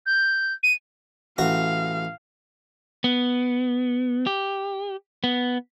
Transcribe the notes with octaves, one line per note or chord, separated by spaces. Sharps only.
G6
D#7
A1 F#4 F5
B3
G4
B3